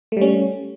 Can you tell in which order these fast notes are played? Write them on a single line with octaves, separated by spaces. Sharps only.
A3 G3 C#4